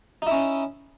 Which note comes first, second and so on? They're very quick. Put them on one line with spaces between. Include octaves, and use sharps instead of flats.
D#4 E4 C#4